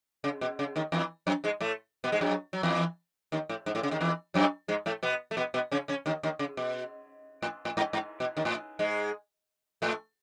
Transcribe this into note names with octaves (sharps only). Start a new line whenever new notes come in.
C#3
B2
C#3
D#2 D#3
E2 E3
F#2 F#3
G#2 G#3
A2 A3
B2 B3
G#2 G#3
F#2 F#3
F#3
E2 E3
D#2 D#3
A2
G#2
A2
C#3
D#2 D#3
E2 E3
F#2 F#3
G#2 G#3
A2 A3
B2 B3
A3
B2 B3
B2 B3
C#3 C#4
C#3 C#4
D#2 D#3
D#2 D#3
C#3
B2
A2
A2
G#2
G#2
B2
D#2 D#3
A2
G#2 G#3
A2 A3